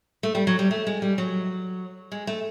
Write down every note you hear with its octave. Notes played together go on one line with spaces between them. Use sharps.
A3
G3
F#3
G3
A3
G#3
G3
F#3
G#3
A3